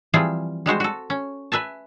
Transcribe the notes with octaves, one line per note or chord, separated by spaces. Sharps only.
E3 F3 G3 C4 F4 G#4
G3 G#3 F#4 C5
F#4 A4
C#4
B4 E5 G#5 A5